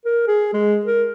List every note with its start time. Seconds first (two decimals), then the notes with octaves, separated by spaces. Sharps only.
0.05 A#4
0.28 G#4
0.54 G#3
0.86 A#4